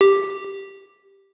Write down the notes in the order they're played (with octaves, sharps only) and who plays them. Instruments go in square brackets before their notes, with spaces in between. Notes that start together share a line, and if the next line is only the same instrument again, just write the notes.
[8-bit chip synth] G4